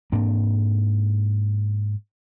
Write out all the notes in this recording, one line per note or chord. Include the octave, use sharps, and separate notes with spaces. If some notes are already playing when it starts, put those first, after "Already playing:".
G#2 A#3 C4 D4